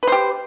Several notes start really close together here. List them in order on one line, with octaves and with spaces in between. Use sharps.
B4 C5 G4